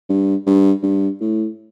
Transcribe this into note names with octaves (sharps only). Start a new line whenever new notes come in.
G2
G2
G2
A2